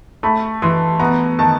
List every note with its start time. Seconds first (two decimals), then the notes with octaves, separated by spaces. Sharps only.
0.23 A3 B5
0.62 E3 C6
1.00 B3 A#5
1.39 D#3 A5